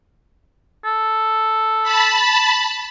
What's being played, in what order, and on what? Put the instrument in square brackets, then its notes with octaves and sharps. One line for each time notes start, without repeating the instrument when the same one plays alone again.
[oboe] A4
[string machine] A5 B5